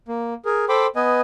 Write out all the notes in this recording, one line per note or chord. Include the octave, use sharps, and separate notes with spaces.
A#3
G#4 A#4
A4 C5 G5 B5 C6 D6
B3 B4 D#5 G#5